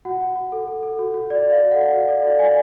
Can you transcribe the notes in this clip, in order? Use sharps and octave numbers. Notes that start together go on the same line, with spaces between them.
F#4 F#5
F#4
F#4
A4
A4
A4
F#4
F#4
F#4 D5
F#4
F5
A4
F#5
F#4
F#4 F5
A4 D5
F#4 F5
D5 G#5